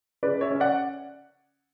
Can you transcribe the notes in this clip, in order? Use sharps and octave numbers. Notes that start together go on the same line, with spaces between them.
C#3 B4 D5
C#5 E5
C#4
D5 F#5